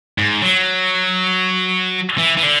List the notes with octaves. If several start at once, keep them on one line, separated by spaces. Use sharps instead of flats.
G#2
F#3
E3
E3
D3